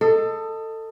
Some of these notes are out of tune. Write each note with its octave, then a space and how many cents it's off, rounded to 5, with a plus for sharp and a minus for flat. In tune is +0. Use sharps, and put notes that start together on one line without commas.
A4 +20 D#5 +0